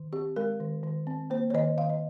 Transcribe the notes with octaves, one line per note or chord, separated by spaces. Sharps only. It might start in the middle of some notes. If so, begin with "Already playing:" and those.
Already playing: D#3
C4 G4
G#3 A#4
D#3
D#3
C4
A#3 C5
C#5
D#3 D#5
D#3 F5
D#5